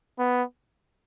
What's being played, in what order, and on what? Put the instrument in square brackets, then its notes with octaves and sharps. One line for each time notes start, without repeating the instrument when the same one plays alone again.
[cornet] B3